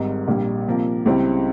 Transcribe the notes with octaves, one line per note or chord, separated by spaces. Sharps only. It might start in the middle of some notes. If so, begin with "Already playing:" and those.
Already playing: G#1 G#2 G3
A#1 A#2 G3
C3 F3 A#3
C#2 C#3 G3 C4 E4